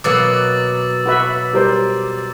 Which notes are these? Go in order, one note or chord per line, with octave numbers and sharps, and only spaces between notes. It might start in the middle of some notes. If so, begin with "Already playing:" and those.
B2 F#3 A#3 D6 E6 A6
F#4 B4 E5
G3 A#4 C5